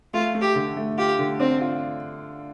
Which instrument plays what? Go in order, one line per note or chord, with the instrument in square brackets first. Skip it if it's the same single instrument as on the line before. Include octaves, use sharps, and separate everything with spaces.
[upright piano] A3 [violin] F4
[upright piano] A3
[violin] G4
[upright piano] D3
A3
[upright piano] F4 [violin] G4
[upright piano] D3
[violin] C4 [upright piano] D4
[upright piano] F4